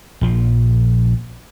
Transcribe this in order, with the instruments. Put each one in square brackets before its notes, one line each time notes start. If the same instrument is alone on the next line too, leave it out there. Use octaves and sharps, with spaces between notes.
[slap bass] A#1 F3